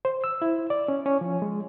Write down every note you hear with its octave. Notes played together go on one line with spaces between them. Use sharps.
C5
E6
E4
D5
C#4
C#4
F3
G#3